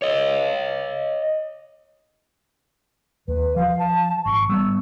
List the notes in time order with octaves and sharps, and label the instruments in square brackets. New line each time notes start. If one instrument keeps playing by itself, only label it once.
[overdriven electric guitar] C#5 D#5
[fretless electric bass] D#2 [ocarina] B4
[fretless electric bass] F3 [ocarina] F5
[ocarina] A5
[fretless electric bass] G#1 [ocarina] C#6
[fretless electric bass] G3 B3 [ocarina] E6